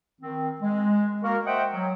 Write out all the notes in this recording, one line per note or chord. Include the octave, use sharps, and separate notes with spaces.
D#3 C4
G#3
A#3 F#4 A#4
C5 D#5 E5 F#5 G5
F#3